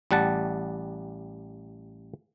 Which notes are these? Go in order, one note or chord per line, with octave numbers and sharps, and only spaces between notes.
A1 G3 F#5 A5